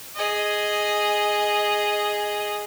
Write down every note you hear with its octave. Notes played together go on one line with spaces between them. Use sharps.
G#4 D#5